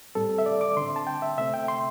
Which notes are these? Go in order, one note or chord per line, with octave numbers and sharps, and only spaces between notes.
A2 G3 C4 A4
E5
D5
D6
D3 C4 C6
A5
G5
E5
C3 A3 C4 E5
G5
C6